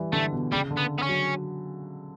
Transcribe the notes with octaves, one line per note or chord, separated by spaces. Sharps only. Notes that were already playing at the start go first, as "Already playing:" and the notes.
Already playing: E3 G3
D3 A3
B2
C#3 G3
D3
B3
B3
C#4
F#3